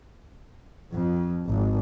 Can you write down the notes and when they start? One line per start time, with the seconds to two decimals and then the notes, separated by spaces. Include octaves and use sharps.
0.94 F2
1.48 G#1